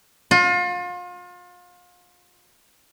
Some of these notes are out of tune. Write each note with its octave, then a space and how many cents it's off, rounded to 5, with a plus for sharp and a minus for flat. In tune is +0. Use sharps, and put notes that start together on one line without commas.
F4 +35